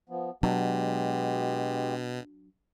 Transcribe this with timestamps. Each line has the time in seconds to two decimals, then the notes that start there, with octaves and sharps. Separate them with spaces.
0.09 F3 B3
0.43 B2 F#3 G#3 B3 D4 G4